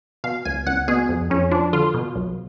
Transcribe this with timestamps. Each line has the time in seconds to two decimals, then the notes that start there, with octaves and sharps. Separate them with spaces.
0.24 B2 F5
0.45 C#2 G#5
0.67 C#2 F#5
0.88 B2 G#4
1.09 F2
1.30 F2 C#4
1.51 F3 D4
1.73 D3 F4
1.94 B2
2.15 B1